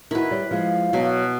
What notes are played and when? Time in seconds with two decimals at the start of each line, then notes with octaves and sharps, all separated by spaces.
0.11 D#3 E4 F#4 B4
0.31 G3 C#5
0.51 F3 G#3 F5
0.93 B2 F#3